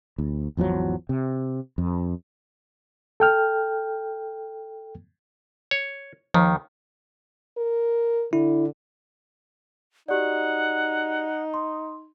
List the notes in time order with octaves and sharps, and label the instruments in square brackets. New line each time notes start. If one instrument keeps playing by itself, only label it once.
[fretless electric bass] D2
G#1 E2 F3 F#3
C3
F2
[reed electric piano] A4 G5 F6
[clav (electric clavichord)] C#5
[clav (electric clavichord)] D#2 D#3 [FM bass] F3
[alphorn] A#4
[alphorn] D3 [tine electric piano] E4
[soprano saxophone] D#4 [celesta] F#4 G4 D5 [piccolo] F#5
[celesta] C6